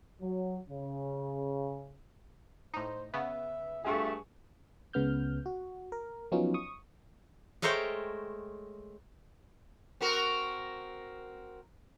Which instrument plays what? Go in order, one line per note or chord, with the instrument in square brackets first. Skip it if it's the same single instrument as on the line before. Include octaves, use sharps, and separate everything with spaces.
[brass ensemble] F#3
C#3
[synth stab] A2 D#4 [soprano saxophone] C5
[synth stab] C#3 B3 [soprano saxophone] E5
[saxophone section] G2 A3 [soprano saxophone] F4 [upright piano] G#4 C#6
[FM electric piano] C#2 C#3 B3 F6 G6
F#4
A#4
F3 F#3 B3 C#4 D#4 F4
C#6 D#6
[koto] G#3 A3 A#4 C5 C#5 G5
[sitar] C4 F#4 A#4